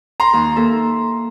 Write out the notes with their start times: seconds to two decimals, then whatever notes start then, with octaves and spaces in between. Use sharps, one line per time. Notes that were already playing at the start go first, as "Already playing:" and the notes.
0.20 A#5 C6
0.33 D#2
0.56 A#3 A4 E5